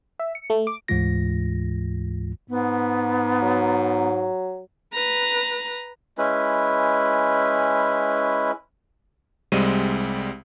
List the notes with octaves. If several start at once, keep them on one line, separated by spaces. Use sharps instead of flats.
E5
C#7
A3
D6
D2 G#2 E3 G#3 F4 A#6
G#2 B3
F#3
B4 A#5
G#3 C#4 E4 B4
C2 G3 G#3 C4 D#7